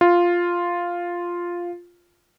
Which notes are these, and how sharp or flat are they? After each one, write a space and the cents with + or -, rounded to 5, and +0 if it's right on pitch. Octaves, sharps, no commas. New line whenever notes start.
F4 +0